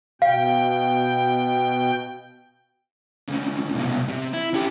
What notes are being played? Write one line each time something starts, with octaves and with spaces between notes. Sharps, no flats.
B2 F5 G5
D2 C#3
C2 B2
C3
E4
C#4 G4